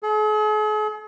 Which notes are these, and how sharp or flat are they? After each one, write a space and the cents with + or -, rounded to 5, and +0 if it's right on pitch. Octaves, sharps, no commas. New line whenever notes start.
G#4 +45